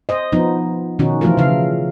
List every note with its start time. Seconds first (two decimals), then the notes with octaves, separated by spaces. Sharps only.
0.09 C5 D#5
0.32 F3 B3 D#4
0.99 B2 D#3 C#4 D#4 F#4
1.21 E3 F3 A3 F4 A#4
1.37 C#3 F5